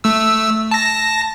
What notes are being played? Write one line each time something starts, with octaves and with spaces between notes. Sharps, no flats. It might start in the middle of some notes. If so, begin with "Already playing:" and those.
A3 E6
A5 A#6